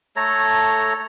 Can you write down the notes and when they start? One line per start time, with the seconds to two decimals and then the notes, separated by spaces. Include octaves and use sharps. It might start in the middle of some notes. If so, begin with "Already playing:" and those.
0.16 A3 A4 C#5 A#5